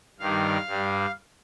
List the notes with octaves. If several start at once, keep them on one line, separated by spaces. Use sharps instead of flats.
G2 D#3 G3 F5
G2 G3